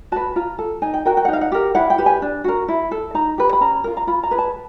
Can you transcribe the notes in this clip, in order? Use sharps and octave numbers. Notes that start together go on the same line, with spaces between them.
F#4 B4 A5
F4 A#5
A4
D#4 G#5
G5
F#4 A#4 G5
G5
F#5
D#4
F5
F#5
G4 A#4
E4 F#5
G5
G4 B4
G#5
D4
F#4 A#4
E4
A4
D#4 A#5
G4 B4
B5
C#4 A#5
F4 A#4
A#5
F4 B5
A#5
G#4 B4
A5